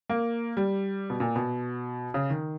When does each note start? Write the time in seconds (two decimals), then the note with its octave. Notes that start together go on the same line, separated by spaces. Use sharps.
0.10 A#3
0.57 G3
1.10 B2
1.20 A#2
1.36 B2
2.14 C#3
2.30 D#3